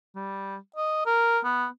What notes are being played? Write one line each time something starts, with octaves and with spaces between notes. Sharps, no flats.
G3
D#5
A#4
B3